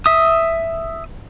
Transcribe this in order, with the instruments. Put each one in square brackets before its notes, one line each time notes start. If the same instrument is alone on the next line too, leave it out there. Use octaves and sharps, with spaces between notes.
[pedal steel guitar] E5 D#6